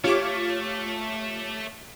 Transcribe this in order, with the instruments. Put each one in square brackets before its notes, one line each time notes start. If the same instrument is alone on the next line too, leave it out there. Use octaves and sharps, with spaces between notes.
[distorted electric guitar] A3 [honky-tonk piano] F4 G4 [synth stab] C#5 D6